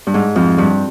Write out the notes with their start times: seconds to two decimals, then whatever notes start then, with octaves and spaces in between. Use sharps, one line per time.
0.07 G2
0.14 G#2
0.36 F2
0.58 G2